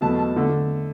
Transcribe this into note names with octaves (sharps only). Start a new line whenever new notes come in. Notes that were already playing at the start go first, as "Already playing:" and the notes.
E2 B2 F#3 A3 A5
A5
D3 A3